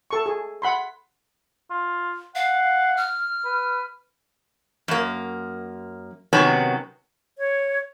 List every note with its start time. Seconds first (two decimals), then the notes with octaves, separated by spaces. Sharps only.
0.11 A4 C#6
0.26 G#4
0.62 F#5 B5 C6
1.70 F4
2.35 F5 F#5
2.97 F6
3.45 B4
4.88 F#2 A#3
6.33 C3 D#3 F#3 B3 C#4
7.38 C#5